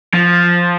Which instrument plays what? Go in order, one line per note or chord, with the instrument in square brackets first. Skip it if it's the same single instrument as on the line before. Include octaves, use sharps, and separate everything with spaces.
[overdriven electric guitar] F3